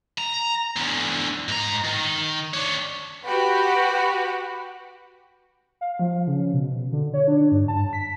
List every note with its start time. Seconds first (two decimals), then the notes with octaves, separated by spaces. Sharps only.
0.18 A#5
0.76 E2 D3
1.49 G#2 A#5
1.85 D#3
2.54 D4 C#5
3.26 F#4 G4 B4 F#5
5.81 F5
5.99 F3
6.27 C#3
6.53 B2
6.92 D3
7.14 C#5
7.28 D4
7.51 G2
7.68 A5
7.93 B6